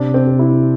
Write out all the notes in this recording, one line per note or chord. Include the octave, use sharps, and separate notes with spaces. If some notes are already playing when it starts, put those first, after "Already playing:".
Already playing: C3 D4
C4
C3
E4